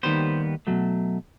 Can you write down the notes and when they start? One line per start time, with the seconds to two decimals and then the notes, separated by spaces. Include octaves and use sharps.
0.03 D#2 D#3 G3 B3 C5
0.67 B2 F#3 A3